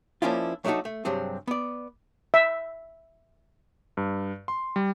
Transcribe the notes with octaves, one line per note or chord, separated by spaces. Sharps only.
F3 A#3 C#4 D4 E4 F4
F#3 A3 D4 D#4 F#4 A4
A3
G2 C3 F#3 C4 G#4
B3 D5
E5
G2
C6
G3